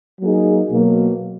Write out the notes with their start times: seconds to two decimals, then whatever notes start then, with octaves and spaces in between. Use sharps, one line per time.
0.20 F#3 A#3 D#4 G#4
0.72 B2 F#3 A#3